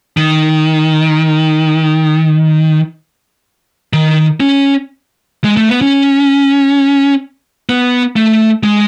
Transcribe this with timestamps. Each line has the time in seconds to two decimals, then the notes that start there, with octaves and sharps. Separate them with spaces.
0.17 D#3
3.93 D#3
4.40 C#4
5.44 G#3
5.57 A3
5.69 B3
5.82 C#4
7.69 B3
8.16 A3
8.63 G#3